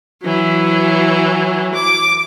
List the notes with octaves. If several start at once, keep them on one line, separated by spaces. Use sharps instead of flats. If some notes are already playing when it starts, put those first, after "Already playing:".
E3 F#3
D6